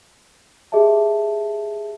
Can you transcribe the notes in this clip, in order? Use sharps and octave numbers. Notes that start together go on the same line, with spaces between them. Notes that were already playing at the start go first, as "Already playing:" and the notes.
G4 G#4 D#5 E5 A5